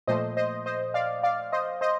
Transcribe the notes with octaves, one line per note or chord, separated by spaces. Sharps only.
A#2 F3 A3 C5 D#5
C5 D#5
C5 D#5
D5 F5
D5 F5
C5 D#5
C5 D#5